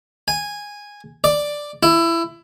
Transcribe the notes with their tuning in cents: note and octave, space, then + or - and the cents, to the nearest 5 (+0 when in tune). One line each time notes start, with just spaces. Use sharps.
G#5 -10
D5 +5
E4 +20